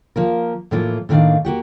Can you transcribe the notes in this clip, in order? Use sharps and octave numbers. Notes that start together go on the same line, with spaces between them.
F3 A#3 A#4
A2 E3 F3 A#3 F4
A2 D3 D#3 A#3 D4 F5
A#3 F#4 G4